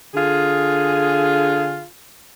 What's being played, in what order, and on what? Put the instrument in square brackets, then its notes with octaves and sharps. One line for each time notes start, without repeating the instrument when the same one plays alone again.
[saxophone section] D3 F4 G#4